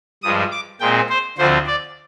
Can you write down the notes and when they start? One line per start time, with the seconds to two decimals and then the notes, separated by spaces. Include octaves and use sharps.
0.23 G2 F3 G#3 D#6
0.52 D6
0.80 A#2 G#3 C4 G5
1.09 C5
1.38 D2 D3 F3 C4 C5
1.67 D5